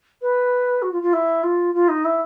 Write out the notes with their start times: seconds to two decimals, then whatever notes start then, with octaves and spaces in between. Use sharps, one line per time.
0.22 B4
0.82 F#4
0.92 F4
1.02 F4
1.13 E4
1.43 F4
1.74 F4
1.88 D#4
2.05 E4